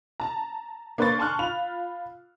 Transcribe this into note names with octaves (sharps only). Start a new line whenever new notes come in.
A5 A#5
A#3 D4 B4 C6 C#6 A6
G#5 A5 C6 C#6 F6 F#6
F4 B5 F7